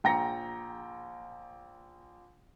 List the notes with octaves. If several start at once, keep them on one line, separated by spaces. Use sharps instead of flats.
A#1 G5 A#5 A#6 C#7